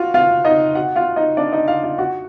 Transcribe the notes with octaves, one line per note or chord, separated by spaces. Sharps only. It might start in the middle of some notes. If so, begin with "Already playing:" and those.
Already playing: F4 F#4 F5
F4 F5
D#4 D#5
F#4 F#5
F4 F5
D#4 D#5
D4 D5
D#4 D#5
F4 F5
F4 F5
F#4 F#5